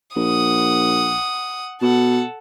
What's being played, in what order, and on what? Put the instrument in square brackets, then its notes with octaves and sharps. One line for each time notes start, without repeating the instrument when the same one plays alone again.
[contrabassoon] A#1 [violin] F#5 D#6
[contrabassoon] B2 [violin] A4 F#5